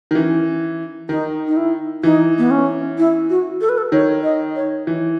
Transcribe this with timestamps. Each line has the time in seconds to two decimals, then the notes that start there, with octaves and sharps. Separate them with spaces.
0.11 D#3
0.15 E3 C#4
1.09 D#3 D#4
1.47 D#4
1.57 E4
2.03 E3 D#4
2.38 B3
2.51 C#4
2.98 E4
3.30 F#4
3.61 A4
3.69 B4
3.78 A4
3.92 D#3 C#5
4.24 D#5
4.56 C#5
4.87 E3